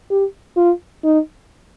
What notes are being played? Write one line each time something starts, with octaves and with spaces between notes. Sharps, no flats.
G4
F4
D#4